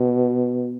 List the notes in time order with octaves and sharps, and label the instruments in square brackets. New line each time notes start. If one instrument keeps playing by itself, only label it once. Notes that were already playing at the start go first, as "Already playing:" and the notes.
Already playing: [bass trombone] B2